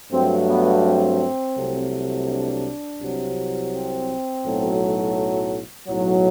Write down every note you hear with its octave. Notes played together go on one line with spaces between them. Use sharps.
G2 F#3 A3 C4
B3
C4
C2 C3 F#3 A3
D4
C2 C3 F#3
C4
B1 A2 F#3 A3
B1 A2 F#3